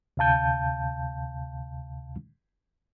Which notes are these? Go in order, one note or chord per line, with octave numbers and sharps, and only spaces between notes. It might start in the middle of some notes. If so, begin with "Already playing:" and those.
D2 C3 F5 A5 G6